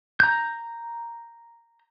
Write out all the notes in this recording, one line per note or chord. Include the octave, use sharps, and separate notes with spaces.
A#5 G6